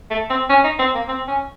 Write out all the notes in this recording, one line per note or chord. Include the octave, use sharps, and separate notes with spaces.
A3
C4
C#4
D#4
C4
A#3
C4
C#4